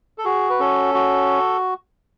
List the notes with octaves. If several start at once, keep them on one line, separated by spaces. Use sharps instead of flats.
A4
F#4 G#4
B4
C#4 A4
F#4